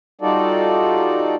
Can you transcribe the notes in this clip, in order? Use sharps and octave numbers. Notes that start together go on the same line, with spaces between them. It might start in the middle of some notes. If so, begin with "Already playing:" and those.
G3 D#4 F4 F#4 A4 D5